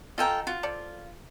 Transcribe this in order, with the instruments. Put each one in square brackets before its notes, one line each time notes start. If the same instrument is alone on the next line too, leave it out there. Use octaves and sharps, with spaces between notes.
[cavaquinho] F4 A4 G5 [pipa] D#5 G#5 A#5
[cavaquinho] F4 [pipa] F#4
[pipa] C4 A4 D5